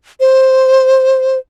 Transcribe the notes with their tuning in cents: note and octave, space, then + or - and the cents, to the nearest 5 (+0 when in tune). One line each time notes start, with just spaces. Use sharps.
C5 +5